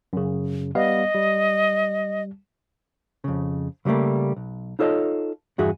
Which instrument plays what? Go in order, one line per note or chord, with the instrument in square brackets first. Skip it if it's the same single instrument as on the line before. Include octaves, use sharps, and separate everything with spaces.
[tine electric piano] F#2 C#3
[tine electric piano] G3 B3 F5 [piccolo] D#5
[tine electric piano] G3
[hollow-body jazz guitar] F2 C#3
C#3 F#3 G3 A3 A#3
B1
D#4 F4 A4 C#5 D#5
E2 G2 F#4 G#4 E5